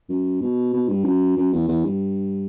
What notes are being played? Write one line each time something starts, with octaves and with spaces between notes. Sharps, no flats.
F#2
B2
B2
G2
F#2
F#2
E2
E2
G2